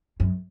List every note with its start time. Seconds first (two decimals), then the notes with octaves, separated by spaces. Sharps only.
0.20 F#2